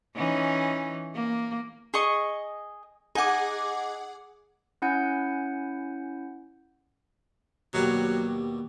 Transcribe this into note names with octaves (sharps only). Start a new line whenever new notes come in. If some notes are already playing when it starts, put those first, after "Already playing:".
E3 C#4 D#4
A#3
G#4 D#5 C#6
D#4 G#4 F#5 G#5 D6
C#4 E4 F#5 G#5 G6
D#2 B2 F#3 G3